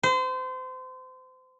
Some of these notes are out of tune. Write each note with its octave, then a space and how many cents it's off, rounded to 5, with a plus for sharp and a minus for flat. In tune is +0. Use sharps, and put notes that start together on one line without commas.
C5 -30